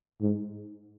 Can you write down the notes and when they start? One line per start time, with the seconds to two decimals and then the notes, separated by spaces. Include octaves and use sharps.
0.21 G#2